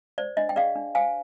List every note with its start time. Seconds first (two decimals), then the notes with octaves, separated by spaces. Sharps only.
0.18 C5 D5
0.37 D4 D#5
0.49 G5
0.56 G#4 D5 F5
0.75 D4
0.95 C5 F5 G#5